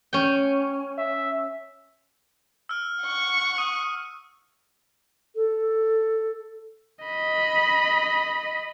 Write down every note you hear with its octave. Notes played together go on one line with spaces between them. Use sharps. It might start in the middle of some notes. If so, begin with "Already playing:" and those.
C#4 G5
E5
E6 F6
F#5 C#6
D#6 D#7
A4
D#5 B5